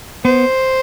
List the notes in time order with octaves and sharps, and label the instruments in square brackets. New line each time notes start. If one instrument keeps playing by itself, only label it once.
[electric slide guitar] B3 [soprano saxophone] C5